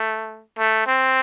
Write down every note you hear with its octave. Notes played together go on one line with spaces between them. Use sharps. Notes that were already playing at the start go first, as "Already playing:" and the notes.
Already playing: A3
A3
C4